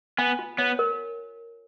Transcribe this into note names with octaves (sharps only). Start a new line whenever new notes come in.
B3 G#5
F4
B3 C#5
A#4